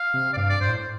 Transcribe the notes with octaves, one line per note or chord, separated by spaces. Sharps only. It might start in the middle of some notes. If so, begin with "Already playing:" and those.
Already playing: F5
C3
D5
G2 F5
D5
G2 C5
A2